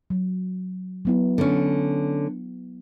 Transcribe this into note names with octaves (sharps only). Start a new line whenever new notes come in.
F#3
F#3 B3 E4
D3 C#4